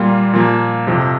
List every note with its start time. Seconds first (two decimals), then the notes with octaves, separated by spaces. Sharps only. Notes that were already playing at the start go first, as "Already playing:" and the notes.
Already playing: A#2 G3 A#3 F4
0.33 A#2 F3 A#3
0.87 F2 C3 F3